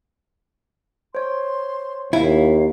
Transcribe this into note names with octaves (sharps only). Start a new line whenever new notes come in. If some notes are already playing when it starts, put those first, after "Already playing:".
C5 C#5 C6
D#2 E4 F5